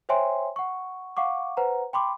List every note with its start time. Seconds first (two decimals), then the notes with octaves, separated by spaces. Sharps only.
0.09 C5 C#5 E5 G5 G#5 C6
0.56 F#5 C#6
1.17 F5 F#5 C#6 D6
1.57 B4 C5 F#5 A#5
1.93 G5 B5 C6 D6